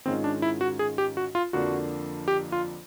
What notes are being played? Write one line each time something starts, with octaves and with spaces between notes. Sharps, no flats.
G#2 D#3 G#3 C4 C#4 F4
D4
E4
F#4
G#4
G4
F#4
F4
F2 D3 F3 A#3 D4 F#4
G4
F4